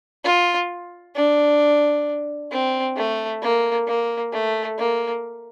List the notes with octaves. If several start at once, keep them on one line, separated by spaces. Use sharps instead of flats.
F4
D4
C4
A3
A#3
A#3
A3
A#3